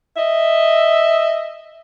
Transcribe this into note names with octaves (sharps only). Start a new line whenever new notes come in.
D#5 E5